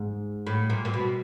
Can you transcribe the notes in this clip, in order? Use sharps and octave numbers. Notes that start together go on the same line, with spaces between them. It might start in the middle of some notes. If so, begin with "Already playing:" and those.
Already playing: G#2
A2
A#2
A#2
B2